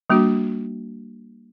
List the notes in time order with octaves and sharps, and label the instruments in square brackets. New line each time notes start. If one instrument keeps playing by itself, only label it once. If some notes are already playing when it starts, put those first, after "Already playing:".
[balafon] G3 A#3 D4 F#4